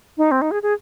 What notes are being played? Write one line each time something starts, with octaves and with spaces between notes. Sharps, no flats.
D#4
C4
D#4
G#4
G#4